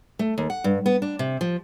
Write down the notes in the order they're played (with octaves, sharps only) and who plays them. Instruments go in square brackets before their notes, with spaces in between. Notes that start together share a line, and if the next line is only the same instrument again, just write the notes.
[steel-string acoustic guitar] A3
D#2
F#5
G2
B3
D4
C3
F3